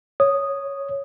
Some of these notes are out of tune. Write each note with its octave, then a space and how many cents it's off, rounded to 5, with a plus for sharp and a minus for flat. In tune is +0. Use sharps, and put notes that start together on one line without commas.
C#5 +0 D#6 -5